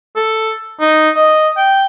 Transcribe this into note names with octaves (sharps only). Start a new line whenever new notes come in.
A4
D#4
D#5
G5